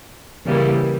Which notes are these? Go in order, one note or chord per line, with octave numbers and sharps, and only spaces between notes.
C#3 E3 G3 A#3